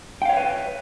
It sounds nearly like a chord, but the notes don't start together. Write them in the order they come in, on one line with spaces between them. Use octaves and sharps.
G5 F5 C#5 E5 B4